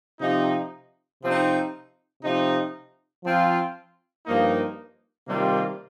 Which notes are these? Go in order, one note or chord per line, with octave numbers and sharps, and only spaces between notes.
C3 F3 D#4
C3 F3 C4 D#4
C3 F3 D#4
F3 C4 F4
G2 F3 A#3 D#4
C3 D#3 G3 A#3 F4